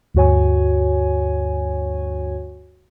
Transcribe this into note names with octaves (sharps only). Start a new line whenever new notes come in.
D2 G2 F#4 C#5 G#5